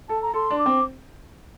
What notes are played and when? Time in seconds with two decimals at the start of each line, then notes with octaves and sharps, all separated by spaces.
0.09 A4 A5
0.22 A#5
0.34 A4 C6
0.50 D4
0.58 D6
0.66 C4